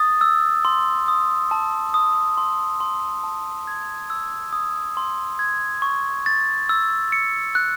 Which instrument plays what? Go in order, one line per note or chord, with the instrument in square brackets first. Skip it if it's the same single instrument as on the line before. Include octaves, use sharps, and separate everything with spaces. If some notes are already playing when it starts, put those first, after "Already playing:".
Already playing: [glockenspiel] D#6 A6
E6
C6
D#6
A5
D#6
C6
C6
A5
G#6
E6
D#6
C6
G#6
C#6
A6
E6
C#7
F#6